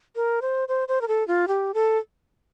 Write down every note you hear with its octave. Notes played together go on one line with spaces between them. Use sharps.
A#4
C5
C5
C5
A#4
A4
F4
G4
A4